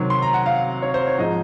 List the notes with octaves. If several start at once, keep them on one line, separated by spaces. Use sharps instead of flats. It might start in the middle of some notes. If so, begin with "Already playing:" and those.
Already playing: C3 D#3 F#3 C4
C6
A#5
F#5
F5
C#5
C5
C#5
G#2 F3 G#3 D#4 D#5